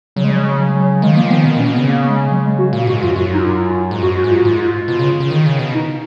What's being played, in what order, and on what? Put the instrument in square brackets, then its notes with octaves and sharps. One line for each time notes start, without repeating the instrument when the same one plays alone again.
[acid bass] C#3 [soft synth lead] F#3
[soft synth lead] G#3
F#3
G#3
F#3
F#3
F#3
[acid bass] D#3 [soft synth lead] G#3
[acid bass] F3 [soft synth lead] A#3
[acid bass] D#3 [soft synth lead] B3
[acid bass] B2
[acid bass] A#2 [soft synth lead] C#4
[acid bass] B2
[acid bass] C#3 [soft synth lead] B3
[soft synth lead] A#3
G#3
F#3
G#3
F#4
[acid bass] A#2
[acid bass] G#2 [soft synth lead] F#4
[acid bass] F#2 [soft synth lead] F4
[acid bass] F#2 [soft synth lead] F#4
[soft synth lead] D#4
F4
F4
[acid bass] G#2
[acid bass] F#2 [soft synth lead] F#4
[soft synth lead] F#4
[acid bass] G#2
[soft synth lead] F4
[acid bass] G#2 [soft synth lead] F4
[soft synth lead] F4
[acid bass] B2
C#3
C#3
D#3
C#3
B2
[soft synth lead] D#4